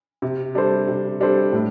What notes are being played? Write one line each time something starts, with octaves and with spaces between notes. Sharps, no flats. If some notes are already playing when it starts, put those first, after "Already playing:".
C3
G3 D4 A4 C5
C3
G3 D4 A4 C5
A2